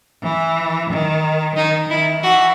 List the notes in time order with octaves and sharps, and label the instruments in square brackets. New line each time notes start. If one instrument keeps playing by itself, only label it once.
[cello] E3
D#3
[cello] D#3 [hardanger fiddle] D#4
[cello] D#3 [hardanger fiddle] E4
[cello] E3 [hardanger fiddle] F#4